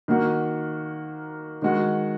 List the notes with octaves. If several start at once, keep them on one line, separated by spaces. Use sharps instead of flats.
D#3 A#3 F#4
D#3 G#3 F#4